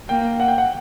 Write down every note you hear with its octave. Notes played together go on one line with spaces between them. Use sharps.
A#3 G5
F#5
G5
F#5